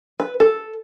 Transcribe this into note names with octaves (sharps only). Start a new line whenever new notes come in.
B4
A4